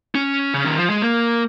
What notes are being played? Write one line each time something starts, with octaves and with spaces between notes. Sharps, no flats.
C#4
C#3
D#3
F3
G#3
A#3